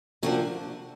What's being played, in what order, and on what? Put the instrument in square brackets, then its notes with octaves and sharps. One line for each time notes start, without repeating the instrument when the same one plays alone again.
[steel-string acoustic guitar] C3 F3 A#3 D4 F#4